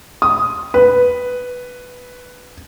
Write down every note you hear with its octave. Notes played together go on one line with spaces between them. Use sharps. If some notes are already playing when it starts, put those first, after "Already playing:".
D#6
B4